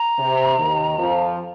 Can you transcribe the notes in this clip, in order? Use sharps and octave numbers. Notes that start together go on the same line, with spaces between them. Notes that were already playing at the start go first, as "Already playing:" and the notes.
Already playing: A#5
C3
D#2 D#3
F2 F3